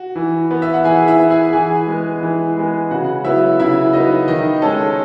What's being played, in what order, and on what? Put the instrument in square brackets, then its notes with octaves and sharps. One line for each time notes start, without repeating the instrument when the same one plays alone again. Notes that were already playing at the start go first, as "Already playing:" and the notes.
Already playing: [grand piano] F#4
E3
B3
E5
F#5
E3 G#4 G#5
E4 E5
B3
G#4 G#5
E3 G#4 G#5
G#3 B3
E3
G#3 B3
C#3 F#4 F#5
F#3 B3 E4 E5
C#3 E4 E5
F#3 B3 D#4 D#5
D#3 D#4 D#5
G#3 C#4 A4